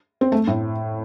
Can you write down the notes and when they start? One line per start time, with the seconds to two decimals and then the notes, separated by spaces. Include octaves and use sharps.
0.21 C4
0.32 A3
0.47 A2